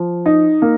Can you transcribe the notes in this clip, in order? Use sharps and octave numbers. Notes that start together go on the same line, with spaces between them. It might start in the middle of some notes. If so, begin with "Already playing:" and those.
Already playing: F3
D#4
A#3